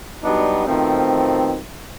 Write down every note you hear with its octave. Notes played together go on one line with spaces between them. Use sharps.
F#3 G3 B3 D4 D#4 F#4
B2 D#3 F3 A3 C4